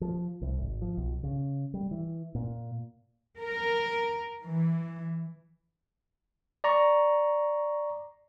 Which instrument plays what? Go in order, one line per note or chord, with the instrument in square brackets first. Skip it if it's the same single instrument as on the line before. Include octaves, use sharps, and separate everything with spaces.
[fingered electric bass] F3
C2
G#1
F3
B1
C#3
G3
E3
A#2
[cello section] A#4
E3
[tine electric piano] D5 A#5 C#6